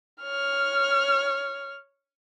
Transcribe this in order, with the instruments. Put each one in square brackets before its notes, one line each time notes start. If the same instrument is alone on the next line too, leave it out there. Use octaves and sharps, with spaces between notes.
[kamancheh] C#5 F6